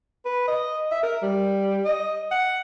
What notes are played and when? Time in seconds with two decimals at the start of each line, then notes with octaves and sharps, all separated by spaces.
0.25 B4
0.48 D#5
0.91 E5
1.03 A#4
1.23 G3
1.85 D#5
2.31 F#5